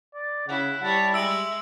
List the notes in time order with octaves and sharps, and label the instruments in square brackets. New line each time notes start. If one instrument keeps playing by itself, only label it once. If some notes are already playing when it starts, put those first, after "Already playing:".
[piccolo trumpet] D5
[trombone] C#3 [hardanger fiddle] E4 [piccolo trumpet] F#5
[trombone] G3 [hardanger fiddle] E4 C#5 [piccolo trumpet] A5
[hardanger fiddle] G#3 [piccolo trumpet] E5 [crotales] E6 D7 F#7